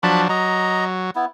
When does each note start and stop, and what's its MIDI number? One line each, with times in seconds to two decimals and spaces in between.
0.03 0.28 53
0.03 0.28 54
0.03 0.28 62
0.03 0.21 81
0.03 0.21 83
0.29 1.11 54
0.29 0.85 75
0.29 0.85 82
1.15 1.25 59
1.15 1.25 64